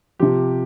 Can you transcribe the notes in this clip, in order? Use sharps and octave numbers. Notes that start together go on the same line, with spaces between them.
C3 F3 G4